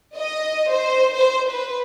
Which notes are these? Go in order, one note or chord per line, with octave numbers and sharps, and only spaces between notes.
D#5
C5
C5
B4